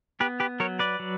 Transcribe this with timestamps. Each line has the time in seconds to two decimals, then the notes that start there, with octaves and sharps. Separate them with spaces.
0.20 B3 G4 B4
0.40 G4 B4
0.60 F#3 A#4 C#5
0.79 B4 D5
1.00 F#3